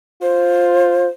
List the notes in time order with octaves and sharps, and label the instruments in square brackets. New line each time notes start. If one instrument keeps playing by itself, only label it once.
[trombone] F4 [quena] C5